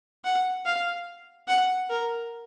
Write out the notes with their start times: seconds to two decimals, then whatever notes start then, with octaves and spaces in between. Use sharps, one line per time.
0.24 F#5
0.66 F5
1.47 F#5
1.90 A#4